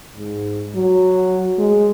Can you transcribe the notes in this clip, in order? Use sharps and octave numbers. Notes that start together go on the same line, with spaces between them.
G#2
F#3
G#3